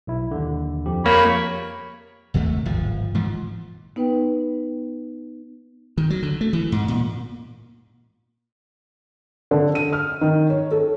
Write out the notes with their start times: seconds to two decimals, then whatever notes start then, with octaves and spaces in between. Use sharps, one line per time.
0.07 B1 E4
0.31 D#2 D3
0.86 F2 F3 G4
1.06 A#3 C#5 B5
2.34 F#1 D#2 C3 A3
2.66 D1 G#1 F3
3.15 G#2 E3 F3
3.96 B3 D#4 B4 G5
5.98 D#3
6.10 F#3
6.22 D3
6.41 A3
6.53 E3
6.72 G#2
6.88 A#2
9.51 D3
9.75 D#7
9.93 F6
10.21 D#3
10.50 C#5
10.71 A4